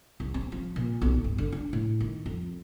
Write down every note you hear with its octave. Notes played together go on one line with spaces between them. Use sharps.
C2
C4
F3
A#2
B1
G1
D3
D4
A2
D#3
F2